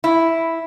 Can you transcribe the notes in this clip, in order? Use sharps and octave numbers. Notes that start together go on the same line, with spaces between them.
E4